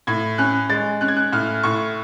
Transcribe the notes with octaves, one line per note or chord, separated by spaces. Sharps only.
A2 G#6
C#4 F#6
G#3 A6
C#4 F#6
G#6
F#6
A2 F6
A2 C#6